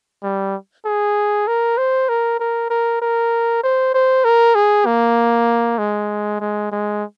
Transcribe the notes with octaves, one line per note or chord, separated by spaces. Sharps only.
G3
G#4
A#4
C5
A#4
A#4
A#4
A#4
C5
C5
A#4
G#4
A#3
G#3
G#3
G#3